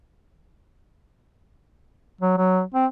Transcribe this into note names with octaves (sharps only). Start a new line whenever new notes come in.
F#3
F#3
C4